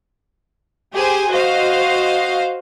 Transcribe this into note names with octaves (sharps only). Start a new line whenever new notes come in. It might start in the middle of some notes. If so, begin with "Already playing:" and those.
G4 G#4 C5 G#5
F#4 C5 D#5 F5